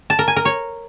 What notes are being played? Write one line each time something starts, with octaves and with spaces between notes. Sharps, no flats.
A5
A#4
G#5
A#4
C#5